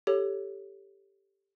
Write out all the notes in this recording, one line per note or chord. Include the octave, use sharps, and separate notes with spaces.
G4 A4 C#5